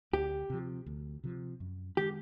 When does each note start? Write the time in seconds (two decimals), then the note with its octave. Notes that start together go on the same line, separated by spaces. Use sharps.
0.13 D2 G4
0.50 C3 F3
0.86 D2
1.24 C3 F3
1.60 F#2
1.97 D#3 G#3 G4